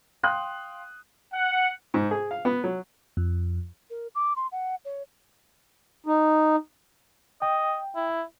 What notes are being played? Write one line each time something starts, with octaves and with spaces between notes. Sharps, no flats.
F5 G5 C6 D#6 F#6
F#5
G#2
G#4
F5
B3
F#3
F2
A#4
D6
C6
F#5
C#5
D#4
D#5 G5
E4